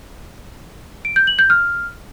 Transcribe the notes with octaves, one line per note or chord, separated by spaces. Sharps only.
D7
G6
F#7
G6
F6